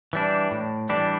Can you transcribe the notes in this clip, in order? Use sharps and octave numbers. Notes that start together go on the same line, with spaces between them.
E3 G3 D4
A2
E3 G3 D4